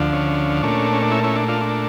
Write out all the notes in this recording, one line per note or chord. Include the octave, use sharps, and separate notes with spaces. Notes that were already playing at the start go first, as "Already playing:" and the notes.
Already playing: D2 D3 F3
C#4
A#2 A3 C#4 D4
C#4
D4
C#4 E4
C#4 E4
D4
D4 F4
D4